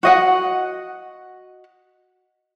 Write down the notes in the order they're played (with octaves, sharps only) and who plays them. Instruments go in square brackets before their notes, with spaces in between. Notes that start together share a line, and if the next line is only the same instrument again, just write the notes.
[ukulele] F#4 D#5 F#5